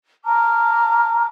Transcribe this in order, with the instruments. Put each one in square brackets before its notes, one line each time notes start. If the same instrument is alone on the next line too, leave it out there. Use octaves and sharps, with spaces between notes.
[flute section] A5 A#5 D6 F6